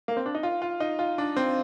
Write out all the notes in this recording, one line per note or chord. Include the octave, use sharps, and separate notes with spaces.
A#3
C4
D4
D#4
F4
F4
D#4
F4
D4
C4